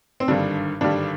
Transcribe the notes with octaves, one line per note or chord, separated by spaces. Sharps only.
C4
G#1 G2 D3 G3 D4
G#1 G2 D3 G3 D4